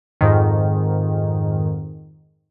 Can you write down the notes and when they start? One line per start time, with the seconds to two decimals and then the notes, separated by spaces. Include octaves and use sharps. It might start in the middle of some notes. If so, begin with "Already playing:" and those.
0.21 F2 G#2 D#3